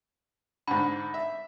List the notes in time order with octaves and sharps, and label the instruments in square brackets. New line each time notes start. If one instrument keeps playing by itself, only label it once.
[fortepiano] G#2 D3 [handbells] B5
[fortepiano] E5